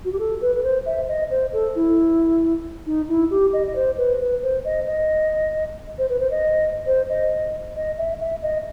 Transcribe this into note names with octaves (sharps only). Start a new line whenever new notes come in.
F#4
G4
A4
B4
B4
C5
E5
D#5
C5
A4
E4
D#4
E4
G4
D#5
D#5
C5
B4
B4
C5
D#5
D#5
C5
B4
C5
D#5
C5
D#5
D#5
E5
E5
D#5